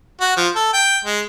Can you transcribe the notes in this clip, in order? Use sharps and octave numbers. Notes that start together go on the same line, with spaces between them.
F#4
F3
A4
G5
G#3